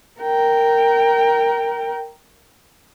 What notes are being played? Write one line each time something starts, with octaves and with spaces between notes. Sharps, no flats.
A#4 G5